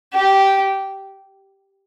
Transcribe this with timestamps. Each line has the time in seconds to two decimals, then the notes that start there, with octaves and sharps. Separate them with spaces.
0.14 G4